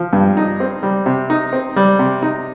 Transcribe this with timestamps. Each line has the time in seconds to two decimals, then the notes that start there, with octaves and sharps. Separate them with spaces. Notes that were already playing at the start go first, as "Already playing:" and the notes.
Already playing: F3
0.13 G2
0.37 D#4
0.60 C4
0.83 G3
1.06 C3
1.30 D#4
1.53 C4
1.76 G3
1.99 C3
2.23 D#4